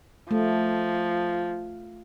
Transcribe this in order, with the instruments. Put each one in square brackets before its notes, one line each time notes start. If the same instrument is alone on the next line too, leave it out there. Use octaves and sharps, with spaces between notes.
[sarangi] F3 [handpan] A3